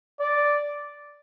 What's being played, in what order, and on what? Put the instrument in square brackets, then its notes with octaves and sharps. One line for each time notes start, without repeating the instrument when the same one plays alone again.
[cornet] D5